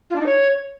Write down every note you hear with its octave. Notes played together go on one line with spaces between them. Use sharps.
F4
D4
D#4
C#5